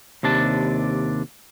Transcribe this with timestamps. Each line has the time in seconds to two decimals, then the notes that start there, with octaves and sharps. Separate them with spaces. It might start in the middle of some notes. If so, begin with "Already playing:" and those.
0.23 D#2 C3 D4 A5